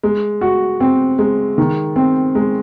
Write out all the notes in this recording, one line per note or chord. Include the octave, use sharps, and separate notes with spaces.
G#3
F#4
C4
G#3
D#3
C4
G#3